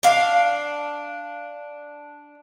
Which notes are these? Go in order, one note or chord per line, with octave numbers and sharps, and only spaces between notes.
D4 F5